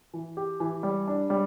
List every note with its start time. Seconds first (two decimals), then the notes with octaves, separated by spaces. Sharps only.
0.14 E3
0.37 G4
0.60 E3
0.83 G3
1.07 D4
1.30 G3